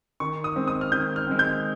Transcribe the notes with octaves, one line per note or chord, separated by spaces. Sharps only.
D#3 C#6
D#6
G#3 C4
D#6
F6
D#3 G6
F6
G#3 C4
G6